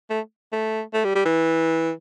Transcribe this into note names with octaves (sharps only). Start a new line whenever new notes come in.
A3
A3
A3
G3
G3
E3